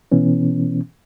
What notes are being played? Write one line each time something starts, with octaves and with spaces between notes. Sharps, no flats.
B2 E3 B3 C#4